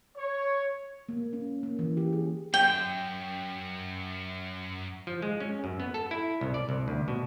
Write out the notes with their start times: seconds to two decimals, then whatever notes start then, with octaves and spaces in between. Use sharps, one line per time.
0.17 C#5
1.09 A#3
1.33 C#4
1.63 A#3
1.79 E3
1.97 G4
2.13 G#4
2.54 F#2 G5
5.07 F3
5.22 G#3
5.40 C#4
5.64 F#2
5.80 B3
5.94 A4
6.11 E4
6.41 C2
6.54 D5
6.69 C2
6.88 D2
7.08 B2